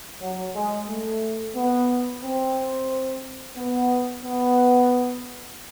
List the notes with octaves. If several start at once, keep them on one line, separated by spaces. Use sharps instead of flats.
F#3
G#3
A3
B3
C4
B3
B3